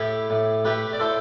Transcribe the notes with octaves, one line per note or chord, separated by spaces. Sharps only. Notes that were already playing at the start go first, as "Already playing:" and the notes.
Already playing: A2 E4 G4
A2
A3 G4 B4
D5
A2 A4 C5